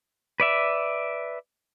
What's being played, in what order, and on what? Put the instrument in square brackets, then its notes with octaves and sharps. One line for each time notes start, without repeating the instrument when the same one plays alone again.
[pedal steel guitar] B4 D5 E5